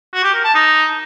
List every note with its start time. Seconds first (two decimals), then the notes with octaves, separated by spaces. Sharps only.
0.13 F#4
0.24 G4
0.34 A#4
0.44 A5
0.55 D#4